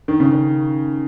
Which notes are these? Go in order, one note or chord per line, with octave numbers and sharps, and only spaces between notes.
D#3
C#3
D#3